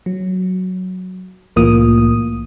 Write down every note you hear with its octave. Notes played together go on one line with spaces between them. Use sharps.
F#3
C2 A2 E3 A#3 F4 D#6